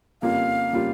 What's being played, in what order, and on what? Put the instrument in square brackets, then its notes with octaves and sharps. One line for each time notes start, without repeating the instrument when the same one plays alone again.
[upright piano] F2 C#3 G3 A#3 F4 [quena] F5
[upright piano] C#3 G3 A#3 F4